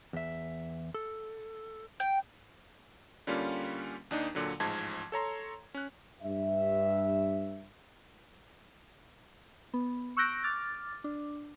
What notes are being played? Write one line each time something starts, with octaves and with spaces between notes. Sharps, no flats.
E2 E5
A4
G5
D3 G3 A#3 C#4 F4
D#2 D4 D#4
A#2 D3 F#3
A1 G#2 F3 A5 G#6
A4 C#5 A#5 C6
C#4 F#6
G2 E5
B3
C#6 E6 F#6 G6 A#6 D7
D6 F6 A6
D4